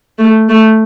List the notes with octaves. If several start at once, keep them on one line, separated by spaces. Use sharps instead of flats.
A3
A3